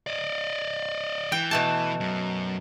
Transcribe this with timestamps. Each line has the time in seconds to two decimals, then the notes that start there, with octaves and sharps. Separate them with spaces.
0.07 D5 D#5
1.32 E3 G5
1.51 B2 A3 A5
2.00 F#2